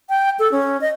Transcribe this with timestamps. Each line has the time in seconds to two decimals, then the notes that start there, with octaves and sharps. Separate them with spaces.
0.09 G5
0.39 A4
0.52 C#4
0.81 D#5